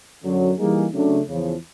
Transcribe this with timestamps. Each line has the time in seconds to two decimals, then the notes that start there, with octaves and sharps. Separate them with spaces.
0.23 F#2 D3 F#3
0.58 E3 G3 A#3 D#4 G#4
0.92 C#3 F#3 A3 D4
1.27 E2 C#3 F3